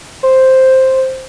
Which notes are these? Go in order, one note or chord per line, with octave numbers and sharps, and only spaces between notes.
C5